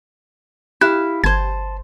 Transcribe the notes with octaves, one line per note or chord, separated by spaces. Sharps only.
E4 G4 F5 F#6
G1 C5 A5 G#6